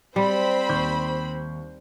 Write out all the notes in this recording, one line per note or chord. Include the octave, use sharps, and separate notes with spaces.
G3 C4 C5 B5
D#2 C#6 G6